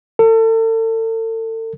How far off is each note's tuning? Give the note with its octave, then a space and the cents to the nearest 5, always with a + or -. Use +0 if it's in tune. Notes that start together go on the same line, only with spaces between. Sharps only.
A4 +35